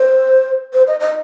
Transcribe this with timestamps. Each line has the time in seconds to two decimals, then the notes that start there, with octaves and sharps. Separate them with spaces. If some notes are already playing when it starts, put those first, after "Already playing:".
Already playing: C5
0.73 C5
0.87 D#5
1.00 D#5